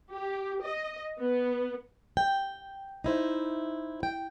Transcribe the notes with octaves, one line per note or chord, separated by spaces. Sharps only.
G4
D#5
B3
G5
D#4 E4 C5
G5